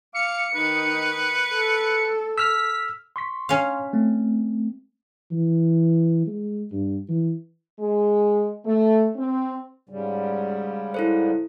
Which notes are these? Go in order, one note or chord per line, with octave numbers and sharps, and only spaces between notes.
F5 D6 C#7
D#3 D#4 B4
A4
E6 F6 B6
C6 C#6 B6
C#4 F5
A3 C4
E3
G#3
G2
E3
G#3
A3
C4
G#2 C#3 G3
E4 A4 C5